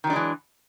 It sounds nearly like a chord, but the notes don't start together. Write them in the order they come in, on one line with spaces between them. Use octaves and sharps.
D#3 F#3 D4 G#3 E3